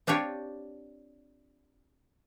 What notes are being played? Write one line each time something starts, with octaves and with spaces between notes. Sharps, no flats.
C4 D4 F4 G4 C#5